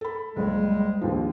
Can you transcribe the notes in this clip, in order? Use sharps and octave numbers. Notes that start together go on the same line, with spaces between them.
A4 B5
F#1 C#2 G3 G#3
A#1 D#2 F3